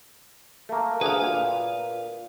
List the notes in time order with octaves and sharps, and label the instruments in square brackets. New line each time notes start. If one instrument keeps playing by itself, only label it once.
[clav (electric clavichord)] A3 A#3
[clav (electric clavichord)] D2 G#4 F#5 [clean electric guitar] B4 F5
[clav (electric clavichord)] A#2